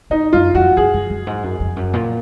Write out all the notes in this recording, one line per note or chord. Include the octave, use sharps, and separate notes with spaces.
G#2 D#4
F#2 F4
F2 F#4
F#2 G#4
F#2
F#2
G#2
F#2
F2
F#2
A#2